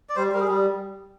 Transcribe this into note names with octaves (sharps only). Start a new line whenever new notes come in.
D5
G3 C5
G3 A#4
G#4
G3